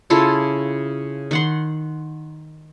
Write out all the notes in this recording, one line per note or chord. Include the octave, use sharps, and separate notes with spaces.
C#3 E4 F4 A4
D#3 F#5 C6